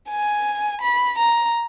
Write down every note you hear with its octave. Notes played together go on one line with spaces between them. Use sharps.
G#5
B5
A#5